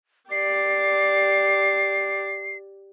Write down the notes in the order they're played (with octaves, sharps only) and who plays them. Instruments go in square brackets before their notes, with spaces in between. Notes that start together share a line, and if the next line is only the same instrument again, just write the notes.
[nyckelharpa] G4 D5 [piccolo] C7